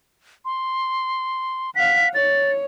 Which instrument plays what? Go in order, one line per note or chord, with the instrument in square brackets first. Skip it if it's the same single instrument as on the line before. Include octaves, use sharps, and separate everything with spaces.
[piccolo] C6
[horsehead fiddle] F5 F#5 [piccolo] B6
[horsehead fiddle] C#5 [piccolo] A6